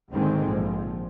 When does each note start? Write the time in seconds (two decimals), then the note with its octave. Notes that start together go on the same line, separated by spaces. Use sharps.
0.11 D#2 G#2 D3 D#3 G#3 C4
0.51 A#1 F3